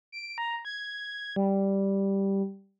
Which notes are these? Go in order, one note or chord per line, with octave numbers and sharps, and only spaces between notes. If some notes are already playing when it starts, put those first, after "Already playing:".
D7
A#5
G#6
G3